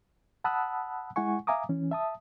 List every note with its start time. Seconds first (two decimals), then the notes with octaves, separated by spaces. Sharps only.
0.44 F#5 A5 B5 D#6 E6 F#6
1.16 G#3 E4 F#5 G#5 C#6
1.47 E5 F5 G#5 A#5 D6 D#6
1.69 E3 C#4
1.91 E5 A5 D#6